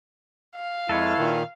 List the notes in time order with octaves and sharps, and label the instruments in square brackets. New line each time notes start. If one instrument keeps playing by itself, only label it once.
[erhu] F5
[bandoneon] F2 G#3 [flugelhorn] E4 [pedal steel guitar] A4 B4 C#5
[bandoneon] A#2 D#3